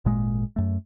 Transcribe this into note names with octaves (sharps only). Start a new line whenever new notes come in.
G#1 A#2 G#3
F#2 A3